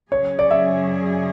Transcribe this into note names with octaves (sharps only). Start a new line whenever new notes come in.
F#2 C#3 F#3 C#4 G#4 C#5
D5
E5